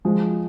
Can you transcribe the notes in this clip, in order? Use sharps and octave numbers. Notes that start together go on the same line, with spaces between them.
F3 G#3